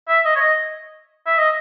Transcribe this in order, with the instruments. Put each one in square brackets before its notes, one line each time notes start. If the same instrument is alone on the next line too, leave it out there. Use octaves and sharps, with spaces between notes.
[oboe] E5
D#5
C#5
D#5
E5
D#5